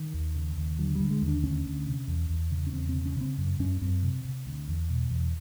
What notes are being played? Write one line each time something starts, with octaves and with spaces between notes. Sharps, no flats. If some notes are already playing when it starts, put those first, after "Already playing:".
Already playing: D#3
D#2
C#3
D#2
D3 F#3
D3 G3
G#3
D#2
D4
D2 C#4
D2
C3
E2
E2
C#3
C#4
E2 C4
C4
C#3
C#4
C#3 C4
F#2
F#2 C#4
F#2 C4
C3
C3
D2
E2
B2
E2